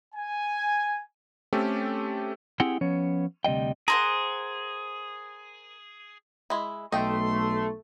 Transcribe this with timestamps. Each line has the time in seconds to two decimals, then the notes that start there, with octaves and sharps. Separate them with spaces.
0.15 G#5
1.53 A3 C4 C#4 G4 A4
2.60 C4 E4 G4 G#4 F#5 G5
2.81 F3 B3 C#4 C#5
3.44 D2 C3 G3 D#5 G5
3.88 G#4 A#4 C5 F#5
6.50 G#3 E4
6.92 B1 A3 D#5 G5 C6